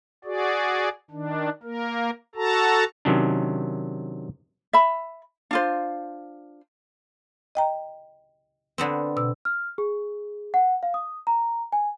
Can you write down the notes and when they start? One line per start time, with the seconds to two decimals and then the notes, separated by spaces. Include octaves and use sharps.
0.25 F#4 G#4 D5
1.11 D#3 D4
1.63 A#3 A#4
2.35 F#4 A4 A5 A#5
3.05 C3 D#3 F#3 C#4 D4
4.73 E5 B5
5.51 D4 F4 C5
7.55 D#5 G5 A#5
8.78 D3 B3 C4
9.17 B2 E6
9.45 F6
9.78 G#4
10.54 F#5
10.83 F5
10.94 D#6
11.27 A#5
11.72 G#5